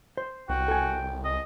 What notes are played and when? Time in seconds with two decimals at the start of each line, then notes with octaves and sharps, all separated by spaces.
0.17 C5
0.49 C2 F#4 G5
0.68 A4 G#5
1.25 D#5